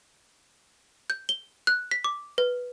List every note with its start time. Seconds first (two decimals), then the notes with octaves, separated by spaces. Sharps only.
1.10 G6
1.29 G7
1.67 F#6
1.91 B6
2.04 D6
2.38 B4